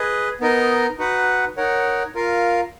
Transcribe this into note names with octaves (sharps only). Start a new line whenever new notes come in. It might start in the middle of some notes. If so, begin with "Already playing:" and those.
Already playing: G#4 B4 D#5
B3 D#4 A#4 D#5
D#4 F#4 B4 F#5
D#4 A#4 C#5 F#5
F4 A#4 F5